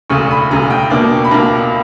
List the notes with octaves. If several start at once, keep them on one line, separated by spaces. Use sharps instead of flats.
E1 D2 C#3 C#6
B5
E1 D2 C#3 A#5
G5
C#2 B2 A#3 D4
B5
C#2 B2 A#3 D4 A#5